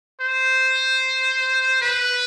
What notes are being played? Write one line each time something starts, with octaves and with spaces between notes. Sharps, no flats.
C5
B4